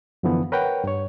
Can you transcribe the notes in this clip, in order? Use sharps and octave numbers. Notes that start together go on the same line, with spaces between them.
F#2 D3 E3 F3 B3
A#4 B4 C#5 F#5 G5
G2 C#5